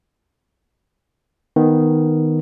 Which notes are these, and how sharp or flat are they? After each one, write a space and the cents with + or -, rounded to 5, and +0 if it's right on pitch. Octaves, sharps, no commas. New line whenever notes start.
D#3 +0 B3 +0